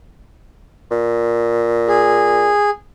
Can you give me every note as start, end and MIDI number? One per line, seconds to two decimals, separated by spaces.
0.91 2.52 46
1.88 2.70 68